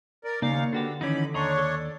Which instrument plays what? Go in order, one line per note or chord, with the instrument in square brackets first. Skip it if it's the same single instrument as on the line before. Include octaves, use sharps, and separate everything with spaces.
[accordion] A#4 D5
[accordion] D#2 F5 [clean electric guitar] C#3 D5 [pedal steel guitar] A#3 C#5 [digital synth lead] D#4
[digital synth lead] D3 [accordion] B3 [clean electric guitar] D4 F#4 G4
[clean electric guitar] D#3 E3 C#4 [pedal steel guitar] D#4 D5 [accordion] B5
[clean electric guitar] D#2 [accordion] D4 C#5 [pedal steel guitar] D#5 A#5 C6
[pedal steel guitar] A4 D5